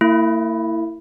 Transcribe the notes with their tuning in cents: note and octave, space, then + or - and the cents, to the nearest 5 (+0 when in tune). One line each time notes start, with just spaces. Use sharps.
A#3 -45 E4 +0